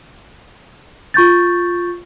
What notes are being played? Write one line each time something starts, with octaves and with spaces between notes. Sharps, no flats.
F4 C#6 G6 A6